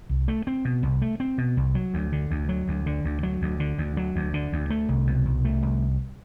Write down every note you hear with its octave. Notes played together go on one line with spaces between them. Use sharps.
C2
A3
C4
B2
C2
A3
C4
B2
C2
F#3
D2
D3
D2
F#3
D2
D3
D2
F#3
D2
D3
D2
F#3
D2
D3
D2
A3
C2
B2
C2
A3
C2